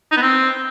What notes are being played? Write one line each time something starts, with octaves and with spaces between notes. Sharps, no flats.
D#4
B3
C4